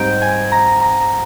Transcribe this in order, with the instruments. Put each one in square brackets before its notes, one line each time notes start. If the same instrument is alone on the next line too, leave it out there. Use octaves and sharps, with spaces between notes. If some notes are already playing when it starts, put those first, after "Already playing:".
Already playing: [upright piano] G#2 G3 C4 D#4 [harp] G5
[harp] G#5
A#5
A#5